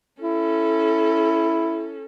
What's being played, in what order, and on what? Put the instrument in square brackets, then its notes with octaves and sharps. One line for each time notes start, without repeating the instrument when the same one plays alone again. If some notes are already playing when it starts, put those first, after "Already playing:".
[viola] C#4 A4 [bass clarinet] E4